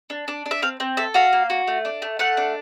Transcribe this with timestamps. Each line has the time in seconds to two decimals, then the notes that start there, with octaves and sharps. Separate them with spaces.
0.10 D4
0.28 D4
0.46 D4
0.51 E5
0.62 C4 F5
0.80 C4
0.97 A4 E5
1.14 F#4 F5
1.33 A#3
1.50 F#4
1.67 A3
1.85 D4
2.02 A3
2.19 A3 F#5
2.37 D4